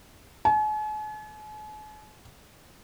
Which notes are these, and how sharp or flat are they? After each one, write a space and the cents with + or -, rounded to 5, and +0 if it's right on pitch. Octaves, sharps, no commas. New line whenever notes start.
G#5 +45